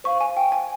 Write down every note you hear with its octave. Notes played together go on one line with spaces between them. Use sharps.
C5 F5 C#6
G#5
G5
G#5